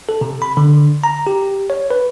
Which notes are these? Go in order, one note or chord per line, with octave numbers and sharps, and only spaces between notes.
A4
C3
B5
D3
A#5
G4
C#5
B4